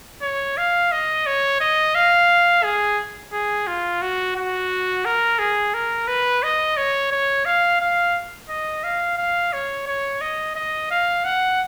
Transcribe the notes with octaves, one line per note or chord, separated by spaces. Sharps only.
C#5
F5
D#5
C#5
D#5
F5
G#4
G#4
F4
F#4
F#4
A#4
G#4
A#4
B4
D#5
C#5
C#5
F5
F5
D#5
F5
F5
C#5
C#5
D#5
D#5
F5
F#5